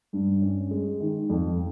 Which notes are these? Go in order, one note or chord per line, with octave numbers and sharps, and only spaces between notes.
G2
C#4
G#3
D#3
F2